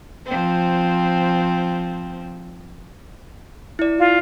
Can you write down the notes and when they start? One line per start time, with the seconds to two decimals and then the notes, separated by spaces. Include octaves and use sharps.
0.26 F3 C4
3.79 E4 D5
3.99 F4